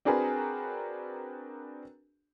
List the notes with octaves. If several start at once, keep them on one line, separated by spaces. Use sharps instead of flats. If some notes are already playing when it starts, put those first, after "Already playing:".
C4 D4 F#4 G#4 A#4 B4